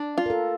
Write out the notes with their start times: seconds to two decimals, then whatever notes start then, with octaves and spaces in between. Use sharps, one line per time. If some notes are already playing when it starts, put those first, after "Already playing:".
Already playing: D4
0.18 F4
0.26 A#4
0.30 A4